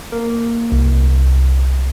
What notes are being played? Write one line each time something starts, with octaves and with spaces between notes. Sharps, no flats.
A#3
C2